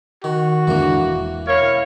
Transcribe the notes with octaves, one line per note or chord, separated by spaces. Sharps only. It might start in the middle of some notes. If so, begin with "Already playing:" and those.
D#3 F#4
E2 G#2 D3 E3 A#3
E1
E4 A#4 C#5 F5